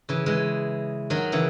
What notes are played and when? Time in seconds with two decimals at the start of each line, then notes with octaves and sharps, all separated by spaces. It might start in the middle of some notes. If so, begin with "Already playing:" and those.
0.09 C#3 E3
0.26 E3 G#3
1.10 D#3 F#3
1.32 C#3 E3